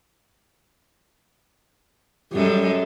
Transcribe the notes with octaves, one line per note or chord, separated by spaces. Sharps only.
F#2 G3 G#3 A4